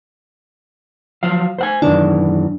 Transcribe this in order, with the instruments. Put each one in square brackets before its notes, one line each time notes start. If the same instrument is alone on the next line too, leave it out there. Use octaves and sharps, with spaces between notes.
[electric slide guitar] F3 F#3 F5
C5 F#5 G#5
[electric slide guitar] F#2 D#3 E3 [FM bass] D4